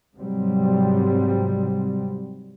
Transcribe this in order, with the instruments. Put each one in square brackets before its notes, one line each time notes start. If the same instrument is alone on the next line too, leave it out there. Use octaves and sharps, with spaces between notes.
[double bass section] G#2 C3 F#3 G3 C4